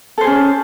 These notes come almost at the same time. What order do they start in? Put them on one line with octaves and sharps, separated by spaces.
A4 C5 G#4 C#4